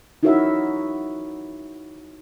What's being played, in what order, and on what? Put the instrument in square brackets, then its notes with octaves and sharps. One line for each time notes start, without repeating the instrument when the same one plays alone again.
[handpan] D#4 E4 F#4 A#4 C#5 E5